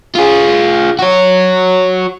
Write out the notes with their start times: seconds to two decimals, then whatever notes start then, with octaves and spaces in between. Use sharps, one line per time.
0.15 F4 G#4
0.99 F#4 C#5